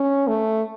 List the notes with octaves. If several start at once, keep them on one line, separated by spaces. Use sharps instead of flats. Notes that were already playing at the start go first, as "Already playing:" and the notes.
Already playing: C#4
A3